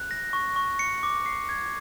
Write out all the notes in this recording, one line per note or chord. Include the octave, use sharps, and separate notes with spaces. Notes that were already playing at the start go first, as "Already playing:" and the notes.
Already playing: F#6
A#6
C#6
C#6
C#7
D6
C7
G#6